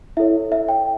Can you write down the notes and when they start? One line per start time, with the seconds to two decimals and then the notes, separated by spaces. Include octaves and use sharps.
0.17 E4 A4 C#5 E5
0.52 E5
0.68 G5